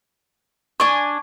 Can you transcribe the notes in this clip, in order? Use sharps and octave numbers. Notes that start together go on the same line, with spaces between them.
D4 G#5 C#6